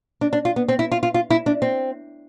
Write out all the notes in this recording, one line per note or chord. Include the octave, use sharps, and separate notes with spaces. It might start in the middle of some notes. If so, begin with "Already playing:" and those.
D4
D4
F4
B3
C4
E4
F4
F4
F4
E4
D4
C4